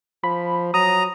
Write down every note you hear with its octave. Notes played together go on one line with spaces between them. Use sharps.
F3 B5
F#3 A#5 D#6